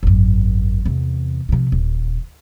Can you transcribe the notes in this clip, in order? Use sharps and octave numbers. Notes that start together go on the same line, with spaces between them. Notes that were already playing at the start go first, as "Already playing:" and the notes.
G#1 F#2
E2 C3
C3 F3
D#1